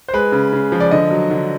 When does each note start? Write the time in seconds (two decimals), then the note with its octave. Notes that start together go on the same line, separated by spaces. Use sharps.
0.08 C5
0.13 G#3 B4
0.32 C#3
0.53 C#3
0.72 F3
0.80 D5
0.91 D3 D#5
1.11 F#3
1.31 D3